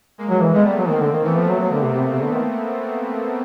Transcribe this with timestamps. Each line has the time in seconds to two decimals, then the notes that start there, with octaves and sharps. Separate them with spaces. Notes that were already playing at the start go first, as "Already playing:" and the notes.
0.18 G#3 A#3
0.30 F#3
0.41 E3
0.53 G#3 A3 B3
0.65 G3
0.77 F#3
0.89 D#3 A#3 C4
1.00 D3
1.12 D#3
1.24 E3 A3 B3
1.36 F3
1.48 F#3
1.60 F#3
1.72 D3
1.83 C3
1.95 C3
2.13 C3
2.22 D3
2.31 D#3